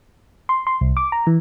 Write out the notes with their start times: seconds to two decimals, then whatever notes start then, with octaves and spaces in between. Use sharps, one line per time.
0.49 C6
0.67 C6
0.81 C2
0.97 D6
1.12 A#5
1.27 E3